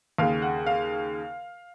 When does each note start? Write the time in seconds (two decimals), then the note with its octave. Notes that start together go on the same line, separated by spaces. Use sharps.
0.18 D#2 C#3 F5
0.42 F#5
0.66 F5